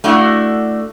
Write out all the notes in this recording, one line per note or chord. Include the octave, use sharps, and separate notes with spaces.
A3 D4 E4 F#4